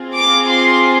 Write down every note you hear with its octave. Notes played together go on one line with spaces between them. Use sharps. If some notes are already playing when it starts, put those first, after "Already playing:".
Already playing: C4 F4 G#4
D6
C6